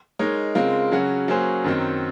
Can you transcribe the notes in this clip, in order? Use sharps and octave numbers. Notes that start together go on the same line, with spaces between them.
G#3 D#4 A#4 C#5
C#3 G#3 C4 F4 A#4
C#3 F#3 C#4 F#4
F#3 A#3 C#4 G#4 C5
F#2 D#3 F#3 C4